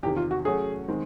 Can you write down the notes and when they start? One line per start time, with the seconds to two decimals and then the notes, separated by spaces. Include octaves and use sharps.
0.03 E2 C3 D#3 G4
0.17 F4
0.31 F#4
0.45 F#3 A3 C#4 F#4 G#4
0.88 D#3 G#3 C4